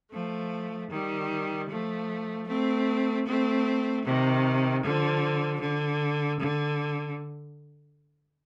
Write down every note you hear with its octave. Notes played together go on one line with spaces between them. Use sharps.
F3 A3
D#3 G3
F3 A3
A3 C4
A3 C4
C3 D#3
D3 F3
D3
D3